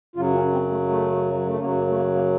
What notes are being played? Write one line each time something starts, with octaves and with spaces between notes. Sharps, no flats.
F#2 C#3 F#3 F4
C#4
C4
A3
A3
F#3
A3
F#2 C#3 F#3 A#3
A#3
A3
A#3
A#3